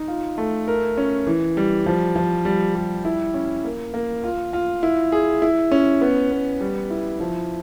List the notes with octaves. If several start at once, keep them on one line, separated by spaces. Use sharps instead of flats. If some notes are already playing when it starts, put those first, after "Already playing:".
Already playing: D#4
F4
A3
A#4
C#4
E3
G3
F3
F3
G3
G3
E4
C#4
A#3
A#3
F4
F4
E4
G#4
E4
C#4
B3
B3
G3
E4
F3